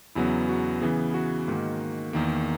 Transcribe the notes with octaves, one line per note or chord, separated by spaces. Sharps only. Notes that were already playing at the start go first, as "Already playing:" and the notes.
E2 C#3 F#3 B3 E4
F#4
C#3 E3 B3 G#4
F#4
G#2 D#3 A#3
E2 D#3 A#3